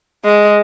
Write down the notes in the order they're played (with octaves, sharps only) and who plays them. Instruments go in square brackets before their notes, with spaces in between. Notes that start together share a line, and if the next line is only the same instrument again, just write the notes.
[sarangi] G#3